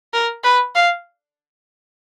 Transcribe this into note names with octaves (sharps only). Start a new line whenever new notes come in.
A#4
B4
F5